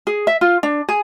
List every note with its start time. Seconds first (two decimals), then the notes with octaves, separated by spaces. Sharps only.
0.07 G#4
0.27 E5
0.41 F4
0.63 D4
0.89 G#4